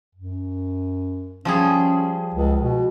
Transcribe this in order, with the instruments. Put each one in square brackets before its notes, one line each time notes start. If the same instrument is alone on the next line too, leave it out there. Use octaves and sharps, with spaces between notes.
[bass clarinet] F#2
[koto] F3 G3 G#4 [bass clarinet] C#4
[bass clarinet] C#2
B2